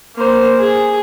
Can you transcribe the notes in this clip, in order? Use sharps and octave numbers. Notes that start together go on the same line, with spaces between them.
A#3 C5
G#4